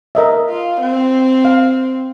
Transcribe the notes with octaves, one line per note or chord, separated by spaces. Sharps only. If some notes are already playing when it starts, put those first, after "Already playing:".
A#4 D#5 E5
F4
C4
F5